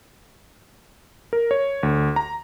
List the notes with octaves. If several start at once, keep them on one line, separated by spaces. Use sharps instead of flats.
A#4
C#5
D2
A#5